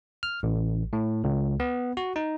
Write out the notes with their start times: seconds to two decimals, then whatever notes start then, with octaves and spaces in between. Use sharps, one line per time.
0.23 F6
0.43 A1
0.93 A2
1.24 C#2
1.60 B3
1.97 F#4
2.16 D#4